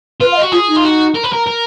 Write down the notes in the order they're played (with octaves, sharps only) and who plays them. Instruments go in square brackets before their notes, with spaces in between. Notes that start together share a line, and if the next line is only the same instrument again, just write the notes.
[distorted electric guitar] F4 [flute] B4
[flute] F5
D#5
[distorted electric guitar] F#4
[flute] F4 [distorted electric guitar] G#4
[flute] D#4
[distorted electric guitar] F4
F#4
A#4
B4
A#4
A#4